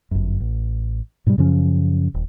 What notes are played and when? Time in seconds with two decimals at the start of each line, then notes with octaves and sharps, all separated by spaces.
0.11 G1 F#2
0.40 A1
1.26 G#2 B2 F#3 G3
1.38 F#2 C#3 F3 C#4
2.14 D#1